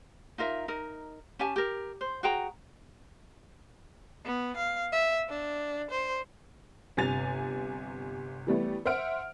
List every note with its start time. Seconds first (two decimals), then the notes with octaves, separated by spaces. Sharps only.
0.38 D#4 F4 A#4 E5
0.68 D#4 A#4
1.39 C#4 G4 G#5 A5
1.56 G4 A#4
2.01 C5
2.23 F#4 G#4 G5 A#5
4.25 B3
4.57 F5
4.92 E5
5.29 D4
5.91 C5
6.97 G1 C3 G#5 A6 F7
8.47 E3 G3 A3 B3
8.85 C5 E5 F#5 F6 D7